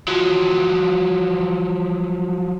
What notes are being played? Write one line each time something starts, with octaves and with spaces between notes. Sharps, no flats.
F3 F#3